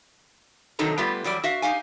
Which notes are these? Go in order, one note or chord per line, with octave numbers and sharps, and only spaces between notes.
C3 D#3 F#3 D#4 A4 A#5
G3 A3 B3 F4 G4
E2 F#3 G3 D5
F#4 E5 F5
D#4 G4 F5 G#5